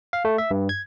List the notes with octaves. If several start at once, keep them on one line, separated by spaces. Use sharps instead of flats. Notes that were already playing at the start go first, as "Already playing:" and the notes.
F5
A3
E5
G2
G#6